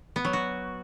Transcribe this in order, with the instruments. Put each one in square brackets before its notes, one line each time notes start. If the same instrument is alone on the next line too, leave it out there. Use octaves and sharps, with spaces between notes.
[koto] B3
F#3
F#4